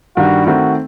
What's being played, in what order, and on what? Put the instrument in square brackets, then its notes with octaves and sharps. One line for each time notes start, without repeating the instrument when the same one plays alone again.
[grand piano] G2 D#3 G3 [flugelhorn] F#4
[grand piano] D#3 A3 C4 [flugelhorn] F#4